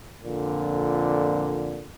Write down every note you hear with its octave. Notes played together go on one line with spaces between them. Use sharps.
F2 A#2 D3